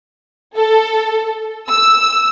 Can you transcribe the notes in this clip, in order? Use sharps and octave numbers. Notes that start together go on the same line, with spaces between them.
A4
E6